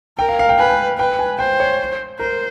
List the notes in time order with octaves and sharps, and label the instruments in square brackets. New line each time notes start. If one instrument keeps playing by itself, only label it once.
[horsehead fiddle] A#4 [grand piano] G5
[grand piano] F5
F5
G5
[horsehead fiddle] B4 [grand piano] G#5
[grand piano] G5
[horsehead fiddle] B4 [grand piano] G5
[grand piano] G#5
[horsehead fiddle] C5 [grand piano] G5
[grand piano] C#5
[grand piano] A#4 [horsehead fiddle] C5